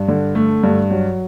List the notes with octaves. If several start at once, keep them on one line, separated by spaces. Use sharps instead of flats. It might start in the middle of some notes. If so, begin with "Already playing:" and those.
Already playing: G2
D3
A3
G2
F#3